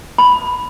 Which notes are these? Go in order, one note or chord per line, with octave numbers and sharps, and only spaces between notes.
B5